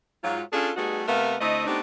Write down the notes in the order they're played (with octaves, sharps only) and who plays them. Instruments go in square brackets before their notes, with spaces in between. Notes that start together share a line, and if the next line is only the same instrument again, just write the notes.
[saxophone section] G#2 F#3 F4
C#4 D4 F4 G#4 A4
G3 A3 B3 D#4 F#4 G#4
C3 A3 B3 A#4 E5 F5
D2 A3 C4 E4 D#5
A3 B3 C4 D4 D#4 G4